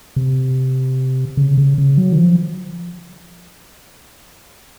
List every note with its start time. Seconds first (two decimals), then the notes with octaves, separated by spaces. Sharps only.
0.16 C3
1.37 C#3
1.58 C#3
1.78 C#3
1.98 F#3
2.13 D#3
2.18 F3